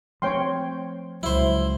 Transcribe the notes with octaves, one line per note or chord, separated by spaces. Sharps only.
F3 A3 C4 C#5 G5 C6
C#2 F#3 E4 C5